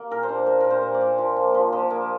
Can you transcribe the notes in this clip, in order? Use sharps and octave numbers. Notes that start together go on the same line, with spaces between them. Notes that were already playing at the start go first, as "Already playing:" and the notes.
Already playing: A#3
A#2 A#4
C5
D4
A#3 A#4
A#2 A#4
C5
A#2
D5
A#2
F3
A#3
F3
F3
A#3